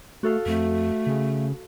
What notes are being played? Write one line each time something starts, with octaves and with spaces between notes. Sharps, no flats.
A3 F#4 A4 F5
F2 A3
C#3